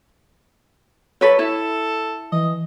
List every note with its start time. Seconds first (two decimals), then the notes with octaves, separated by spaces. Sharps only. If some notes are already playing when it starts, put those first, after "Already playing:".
1.21 F#3 A4 B4 C#5
1.39 E4 A4
2.32 E3 D#5